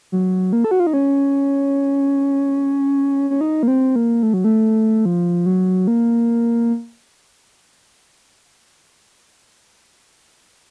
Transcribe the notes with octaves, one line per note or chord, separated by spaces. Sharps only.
F#3
A#3
A4
F#4
F4
D#4
C#4
C#4
D#4
A#3
C4
A#3
A3
F#3
A3
F3
F#3
A#3